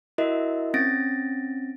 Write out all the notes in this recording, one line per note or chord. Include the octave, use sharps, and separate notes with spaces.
E4 F#4 A#4 D#5 E5
C4 C#4 A6 A#6 D7